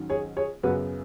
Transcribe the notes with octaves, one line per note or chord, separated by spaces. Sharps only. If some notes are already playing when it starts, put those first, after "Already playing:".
Already playing: G#2 D#3 F#3 C#4
G#4 C#5
G#4 C#5
F#2 C#3 B3 F#4 B4